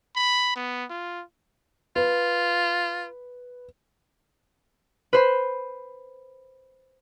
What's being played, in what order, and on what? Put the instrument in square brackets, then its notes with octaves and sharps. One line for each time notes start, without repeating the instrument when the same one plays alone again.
[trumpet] B5
B3
F4
[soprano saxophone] F4 [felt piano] B4
[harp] B4 C5 B5